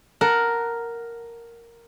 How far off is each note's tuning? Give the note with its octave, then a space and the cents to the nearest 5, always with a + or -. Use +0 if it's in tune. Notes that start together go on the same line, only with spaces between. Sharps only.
A#4 +0 F#5 +0 A5 +0